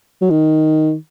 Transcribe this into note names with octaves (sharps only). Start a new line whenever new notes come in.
F#3
D#3